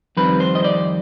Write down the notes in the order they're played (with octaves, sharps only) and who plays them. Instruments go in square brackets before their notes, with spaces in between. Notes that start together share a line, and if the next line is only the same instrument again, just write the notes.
[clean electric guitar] F2 D#3 G3 C4 B4
C5
D#5
D5